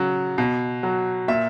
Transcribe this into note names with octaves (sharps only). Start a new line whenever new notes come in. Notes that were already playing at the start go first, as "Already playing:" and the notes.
Already playing: C#3 F#3
B2
F#3
A#2 E5